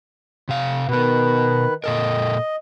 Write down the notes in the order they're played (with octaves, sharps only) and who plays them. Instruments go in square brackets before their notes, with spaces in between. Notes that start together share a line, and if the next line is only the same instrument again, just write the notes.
[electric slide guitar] C3 F5
[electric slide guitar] B2 B3 [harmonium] D#3 B4
[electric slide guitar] A#2 A4 A#4 [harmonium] D#5